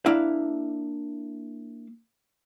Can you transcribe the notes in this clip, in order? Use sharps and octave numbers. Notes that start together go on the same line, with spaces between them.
A#3 D4 E4 F5